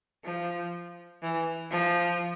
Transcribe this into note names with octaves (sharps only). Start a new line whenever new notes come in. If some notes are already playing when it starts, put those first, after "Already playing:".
F3
E3
F3